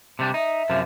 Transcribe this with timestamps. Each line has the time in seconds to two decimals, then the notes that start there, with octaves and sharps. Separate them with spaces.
0.19 C3 G3 D4
0.34 D#4 E5
0.70 F#2 C3 F3